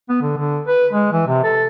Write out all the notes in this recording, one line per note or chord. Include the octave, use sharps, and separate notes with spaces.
B3
D3
D3
B4
G#3
E3
C3
A4